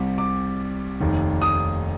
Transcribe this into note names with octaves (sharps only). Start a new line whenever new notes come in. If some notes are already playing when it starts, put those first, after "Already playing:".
Already playing: C2 C3 G3
D6
F1 D#2 D#3
D#6